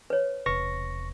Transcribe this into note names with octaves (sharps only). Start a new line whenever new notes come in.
B4 C#5
E1 C3 B4 C#6 A#6